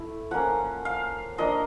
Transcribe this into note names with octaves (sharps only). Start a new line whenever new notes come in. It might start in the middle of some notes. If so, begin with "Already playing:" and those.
Already playing: A3 E4
F3 A#3 C#4 F#5
F5
F3 A#3 D4 D#5